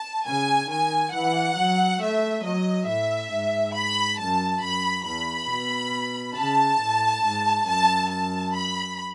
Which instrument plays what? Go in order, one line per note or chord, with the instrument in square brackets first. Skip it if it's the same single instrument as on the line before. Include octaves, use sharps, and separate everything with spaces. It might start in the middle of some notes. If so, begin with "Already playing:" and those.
Already playing: [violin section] A5
[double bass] C#3 [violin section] G#5
[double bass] D#3 [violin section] G#5
[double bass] E3 [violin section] F#5
[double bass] F#3
[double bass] A3 [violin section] E5
[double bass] F#3 [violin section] D#5
[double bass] A2 [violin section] E5
[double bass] G#2
[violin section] B5
[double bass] F#2 [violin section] A5
[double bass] F#2 [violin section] B5
[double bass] E2 [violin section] B5
[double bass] B2
[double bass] C#3 [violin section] A5
[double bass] A2
G#2
[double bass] F#2 [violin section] A5
[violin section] A5
B5